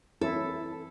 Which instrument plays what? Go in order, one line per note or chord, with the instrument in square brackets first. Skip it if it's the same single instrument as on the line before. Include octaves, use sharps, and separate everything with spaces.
[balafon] E3 C4 C#5 [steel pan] E4 [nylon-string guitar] A4